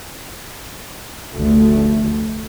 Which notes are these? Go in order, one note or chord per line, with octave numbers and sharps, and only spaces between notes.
F1 D2 A3